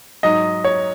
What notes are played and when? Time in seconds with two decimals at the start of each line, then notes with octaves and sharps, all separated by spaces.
0.23 G#2 F#3 D#5
0.64 C#5